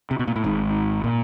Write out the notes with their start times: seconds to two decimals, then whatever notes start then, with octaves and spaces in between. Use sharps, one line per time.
0.11 C3
0.19 B2
0.27 A#2
0.36 A2
0.44 G#1 G#2
1.04 A#2